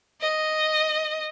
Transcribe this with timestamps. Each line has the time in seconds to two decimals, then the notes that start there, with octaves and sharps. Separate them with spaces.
0.21 D#5